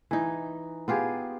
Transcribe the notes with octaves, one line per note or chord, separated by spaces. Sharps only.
E3 D#4
B3 F4 G4 G#4